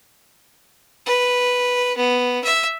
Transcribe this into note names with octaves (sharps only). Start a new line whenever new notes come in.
B4
B3
E5